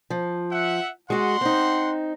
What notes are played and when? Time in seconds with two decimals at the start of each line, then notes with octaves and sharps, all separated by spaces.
0.10 F3
0.51 E5 F#5
1.10 G#3 F#4 F#5 C6
1.41 C4 D#4